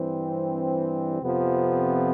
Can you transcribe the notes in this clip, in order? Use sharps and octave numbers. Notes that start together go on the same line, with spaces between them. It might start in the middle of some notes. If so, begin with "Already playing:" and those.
Already playing: G2 E3 G3 C4
F2 C3 F3 B3